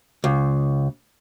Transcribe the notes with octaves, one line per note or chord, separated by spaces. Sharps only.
C#2